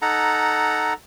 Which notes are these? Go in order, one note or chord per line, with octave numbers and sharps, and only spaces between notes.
D#4 A4 F#5 A#5